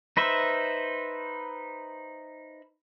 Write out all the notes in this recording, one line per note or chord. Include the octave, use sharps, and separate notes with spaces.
D#4 B4 C5 E5